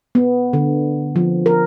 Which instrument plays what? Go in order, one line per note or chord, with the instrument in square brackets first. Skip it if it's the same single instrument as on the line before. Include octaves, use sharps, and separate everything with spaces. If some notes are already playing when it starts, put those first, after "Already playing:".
[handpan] B3
D3
F3
A#4